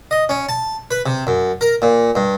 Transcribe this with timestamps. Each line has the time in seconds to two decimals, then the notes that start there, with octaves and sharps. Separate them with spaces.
0.11 D#5
0.29 C#4
0.49 A5
0.91 B4
1.06 C3
1.27 F#2
1.61 A#4
1.82 A#2
2.15 G2